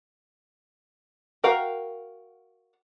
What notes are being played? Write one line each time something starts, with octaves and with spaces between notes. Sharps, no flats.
F#4 A#4 F5 G5